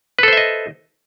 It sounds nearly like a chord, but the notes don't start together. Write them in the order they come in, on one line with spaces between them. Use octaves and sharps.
B4 A4 C5 E5 D#5